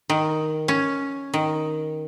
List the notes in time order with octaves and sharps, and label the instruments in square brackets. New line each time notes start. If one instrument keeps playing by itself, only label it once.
[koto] D#3
C#4
D#3